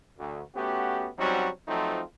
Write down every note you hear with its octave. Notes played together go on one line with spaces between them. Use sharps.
D2
A3 B3 C#4 F#4 G4
F#3 G3 C4 C#4 D#4 F#4
F3 F#3 A3 C4 D#4 F4